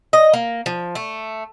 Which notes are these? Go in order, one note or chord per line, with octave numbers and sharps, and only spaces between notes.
D#5
A#3
F3
A3